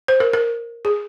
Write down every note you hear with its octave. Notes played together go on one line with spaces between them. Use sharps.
C5
A#4
A#4
G#4